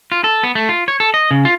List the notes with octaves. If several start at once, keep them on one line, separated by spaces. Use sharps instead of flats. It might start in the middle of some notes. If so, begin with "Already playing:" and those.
F4
A4
B3
A3
F4
C#5
A4
D#5
C#3
F4